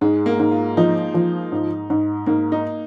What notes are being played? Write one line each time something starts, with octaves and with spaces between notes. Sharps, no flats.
G#2 G#3
A#3
G#2
F4
F3 D#4
F3
G#2
G#2
G#2 A#3
D#4